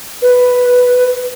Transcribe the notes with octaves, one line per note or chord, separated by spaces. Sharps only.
B4